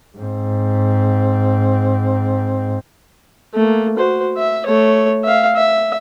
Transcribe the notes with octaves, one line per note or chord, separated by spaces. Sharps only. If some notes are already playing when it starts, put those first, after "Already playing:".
G#2 C4
A3 A#3
F#4 C5
E5
A3 C#5
E5 F5
E5